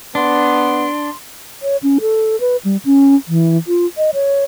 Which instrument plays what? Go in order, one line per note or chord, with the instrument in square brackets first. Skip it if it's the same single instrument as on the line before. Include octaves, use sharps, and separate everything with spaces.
[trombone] B3 [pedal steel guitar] D4 [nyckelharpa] C6
[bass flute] C#5
C#4
A4
B4
G3
C#4
E3
F4
D#5
C#5